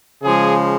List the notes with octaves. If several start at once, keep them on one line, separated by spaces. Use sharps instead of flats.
C#3 F3 G#3 G#4